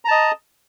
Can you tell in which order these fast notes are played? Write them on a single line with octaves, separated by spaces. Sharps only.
A#5 A5 D#5